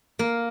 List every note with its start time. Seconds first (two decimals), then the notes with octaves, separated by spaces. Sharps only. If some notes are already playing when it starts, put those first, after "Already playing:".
0.19 A#3